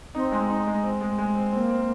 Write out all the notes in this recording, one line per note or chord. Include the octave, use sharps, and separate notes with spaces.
C4 D#4
G#3
D#4
G#3
C4
G#3
G#3
C4
A#3 C4
C4